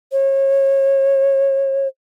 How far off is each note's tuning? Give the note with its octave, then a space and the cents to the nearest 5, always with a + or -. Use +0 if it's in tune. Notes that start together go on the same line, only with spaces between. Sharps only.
C#5 -30